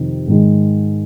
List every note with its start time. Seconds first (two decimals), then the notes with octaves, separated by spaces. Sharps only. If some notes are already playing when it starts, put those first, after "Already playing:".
Already playing: F2 C3 D#3
0.28 G#2 D#3 G#3